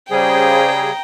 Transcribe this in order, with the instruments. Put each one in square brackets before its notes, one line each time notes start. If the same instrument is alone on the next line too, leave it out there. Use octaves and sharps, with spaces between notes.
[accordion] C#3 G3 G#4 [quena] C5 [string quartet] G5 A#5